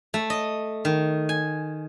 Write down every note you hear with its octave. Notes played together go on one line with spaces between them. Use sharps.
A3
D#5
D#3
G#5